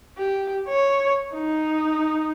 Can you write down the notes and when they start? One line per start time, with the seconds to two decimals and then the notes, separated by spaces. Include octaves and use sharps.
0.17 G4
0.69 C#5
1.33 D#4